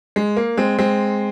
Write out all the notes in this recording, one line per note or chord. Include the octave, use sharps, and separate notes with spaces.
G#3
A#3
G#3 C4
G#3 C4